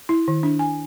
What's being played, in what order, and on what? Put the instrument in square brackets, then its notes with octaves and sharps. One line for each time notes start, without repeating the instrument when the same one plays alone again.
[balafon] E4
D#3
D4
G#5